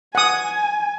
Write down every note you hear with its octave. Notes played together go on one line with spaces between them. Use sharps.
F#5 G#5 D#6